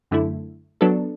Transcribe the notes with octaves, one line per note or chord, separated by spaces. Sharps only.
F#2 D3 A3 E4
F#3 B3 D4 A4